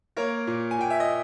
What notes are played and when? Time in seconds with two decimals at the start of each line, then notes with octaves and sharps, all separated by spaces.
0.17 A#3 A#4 C#5
0.47 A#2
0.71 G#5
0.78 A#2 G5
0.90 E5
1.00 D#5